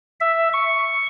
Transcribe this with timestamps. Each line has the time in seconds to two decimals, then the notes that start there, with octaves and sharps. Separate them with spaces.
0.21 E5
0.53 C#6